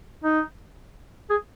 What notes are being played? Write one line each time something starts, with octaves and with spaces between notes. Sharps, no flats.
D#4
G#4